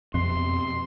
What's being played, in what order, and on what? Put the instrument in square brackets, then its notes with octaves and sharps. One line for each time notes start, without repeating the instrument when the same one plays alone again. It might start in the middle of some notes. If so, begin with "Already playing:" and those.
[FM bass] F2 [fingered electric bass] B2 C4 [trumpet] C6